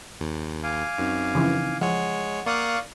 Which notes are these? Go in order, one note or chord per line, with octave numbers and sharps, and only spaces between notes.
D#2
F5 G#5 D6
F#2 C4 D#4
C#3 E3 F3
F3 G#3 C#5 F#5
A#3 D5 F5 C#6 D#6 F#6